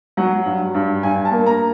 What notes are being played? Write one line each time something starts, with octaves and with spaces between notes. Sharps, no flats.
F#3 F#5
G2
G2
G2 G#5
A5
A#3
A#5